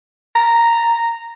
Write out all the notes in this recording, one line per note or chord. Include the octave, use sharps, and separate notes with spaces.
A#5